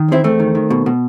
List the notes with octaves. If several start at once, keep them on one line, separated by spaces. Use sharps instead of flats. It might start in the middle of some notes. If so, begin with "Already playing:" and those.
Already playing: D#3
E2 C4 E4
E2 A3 C4
D#3
D#3
B2
B2